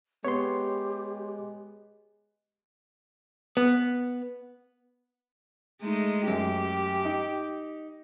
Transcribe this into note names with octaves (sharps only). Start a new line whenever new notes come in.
G#3 B3 G4 C#5 C6
B3
G#3 A3 D#4
F#2 G4
D#4